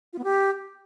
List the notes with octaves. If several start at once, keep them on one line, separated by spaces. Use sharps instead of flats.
F4
B3
G4